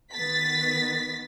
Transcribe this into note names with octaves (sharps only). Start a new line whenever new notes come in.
D#3 B3 A6 B6